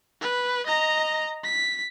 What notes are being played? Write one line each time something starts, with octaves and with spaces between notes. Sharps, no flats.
B4
D#5 A#5
B6